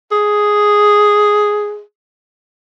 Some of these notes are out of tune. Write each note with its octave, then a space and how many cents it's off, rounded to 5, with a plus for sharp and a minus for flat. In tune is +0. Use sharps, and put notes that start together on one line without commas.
G#4 +0